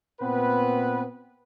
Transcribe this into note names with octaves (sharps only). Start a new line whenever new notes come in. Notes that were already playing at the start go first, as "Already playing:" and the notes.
A#2 B3 C4 B4